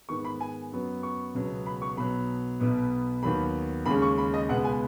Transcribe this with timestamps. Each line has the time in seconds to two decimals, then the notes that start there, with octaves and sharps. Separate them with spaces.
0.09 G#2 D#3 B3 C#6
0.25 B5
0.41 G#5
0.72 F#2 F#3 B3
1.03 C#6
1.35 C#2 B2 F#3 B3
1.66 B5
1.82 C#6
1.97 B1 B2 F#3 B3 B5
2.60 B1 B2 B3
3.23 D#2 D#3 F#3 B3 B5
3.86 D#2 C#3 G#3 C#4 B5
4.02 C#6
4.18 B5
4.34 D#5
4.49 C#2 B2 G#3 B3 F#5
4.64 G#5